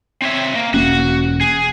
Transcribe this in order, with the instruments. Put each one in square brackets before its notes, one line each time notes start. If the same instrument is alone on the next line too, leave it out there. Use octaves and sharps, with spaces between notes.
[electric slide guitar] C4 C#5 E5
A#3
[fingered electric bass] E1 A#3 C#4 [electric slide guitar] F#4
[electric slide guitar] G#4